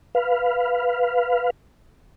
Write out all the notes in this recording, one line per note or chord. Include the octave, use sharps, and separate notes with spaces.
B4 F5